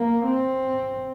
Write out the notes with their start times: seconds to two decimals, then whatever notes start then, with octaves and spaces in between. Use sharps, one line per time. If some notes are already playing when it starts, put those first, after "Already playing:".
Already playing: A#3
0.27 C4